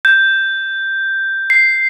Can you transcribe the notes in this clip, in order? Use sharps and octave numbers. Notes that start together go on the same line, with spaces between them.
G6
C7